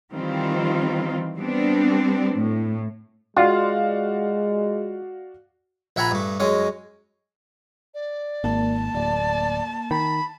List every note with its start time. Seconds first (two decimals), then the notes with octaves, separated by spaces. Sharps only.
0.14 D#3 E3 G3 C4 F4
1.37 G3 B3 C4 D4
2.34 A2
3.37 G#3 F4 F#4 D5 F5
5.96 A#1 E5 F#5 G#5 A#5 B5
6.11 G2 A3
6.40 F#2 G#3 C#4 D#5
7.94 D5
8.44 G#1 A#3 A5
8.95 D1 D5
9.91 D#3 B5